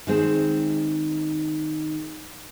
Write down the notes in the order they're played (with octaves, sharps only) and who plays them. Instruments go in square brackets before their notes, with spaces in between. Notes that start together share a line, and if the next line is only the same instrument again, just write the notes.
[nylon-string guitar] D#3 G#3 C4 G#4